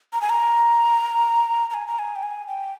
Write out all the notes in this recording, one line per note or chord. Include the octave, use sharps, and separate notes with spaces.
A#5
G#5
A#5
A#5
G#5
A#5
G#5
G5
G#5
G5